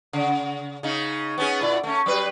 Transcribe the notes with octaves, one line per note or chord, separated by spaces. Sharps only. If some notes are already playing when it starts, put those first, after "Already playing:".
C#3
C#3 D#4
B3 C#4 G#4
A#2 E4 D5
A3 C#4
F#3 G3 B4